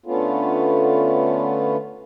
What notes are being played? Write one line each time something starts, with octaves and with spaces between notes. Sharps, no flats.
D3 A3 B3 C#4 F4